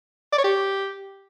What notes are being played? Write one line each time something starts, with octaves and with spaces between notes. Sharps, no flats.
D5
C#5
G4